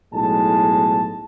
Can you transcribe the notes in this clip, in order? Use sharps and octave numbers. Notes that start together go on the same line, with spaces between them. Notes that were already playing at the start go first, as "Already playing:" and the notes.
B1 A2 G#3 A5